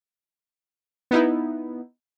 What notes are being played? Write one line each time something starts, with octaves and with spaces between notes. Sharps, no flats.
B3 D#4 E4